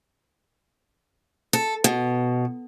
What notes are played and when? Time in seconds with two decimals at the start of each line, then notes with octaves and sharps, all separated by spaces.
1.53 A4
1.84 B2